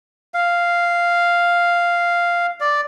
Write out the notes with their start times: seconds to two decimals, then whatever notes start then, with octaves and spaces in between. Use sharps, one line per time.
0.34 F5
2.60 D5